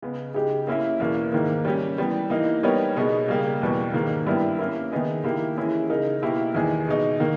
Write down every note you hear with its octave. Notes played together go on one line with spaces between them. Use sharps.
C#3 G#3 B3
C#3 G#3 D#4 G4
A#3 C#4 E4 A#4 E5
E2 B2 A#3 E4
G#2 D#3 A#3
G3 C#4 G4
E3 G3 B3
E3 A#3 D#4
G3 B3 D#4 A#4 C#5
B2 G#3 B3 D#4
C#3 G3 A#3
E2 B2 G3
G#2 D#3 A#3
G2 G3 B3 E4 A#4
A#3 C#4 E4 A#4
D#3 G#3 B3 D#4 G#4
D#3 A#3 E4 G4
E3 G#3 C#4 E4 G#4
C#3 G#3 D#4 A#4
B2 A#3 E4 G4 A#4
E2 D#3 G#3 D#4 G#4
B2 G#3 D#4
D#3 A#3